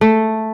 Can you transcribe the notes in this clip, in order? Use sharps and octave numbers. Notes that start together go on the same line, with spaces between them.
A3